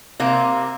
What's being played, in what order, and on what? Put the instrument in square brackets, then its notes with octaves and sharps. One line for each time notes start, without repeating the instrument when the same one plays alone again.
[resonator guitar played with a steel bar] C3 A#3